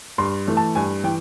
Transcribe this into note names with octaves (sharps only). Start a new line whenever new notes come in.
G2 C6
E3 A3
A5
G2 G#5
E3 G5